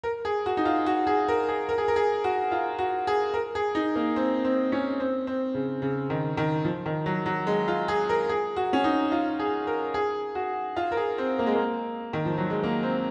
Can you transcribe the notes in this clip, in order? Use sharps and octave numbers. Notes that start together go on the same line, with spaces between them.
A#4
G#4
F#4
D#4
F4
F#4
G#4
A#4
G#4
A#4
G#4
A#4
G#4
F#4
F4
F#4
G#4
A#4
G#4
D#4
A#3
C4
C4
C#4
C4
C4
C#3
C#3
D#3
D#3
F3
D#3
F#3
F#3
G#3
F4
G#4
A#4
G#4
F#4
C#4
D#4
F4
G#4
A#4
G#4
F#4
F4
A#4
G#4
C4
A#3
G#3
A#3
D#3
F3
F#3
G#3
A#3
C4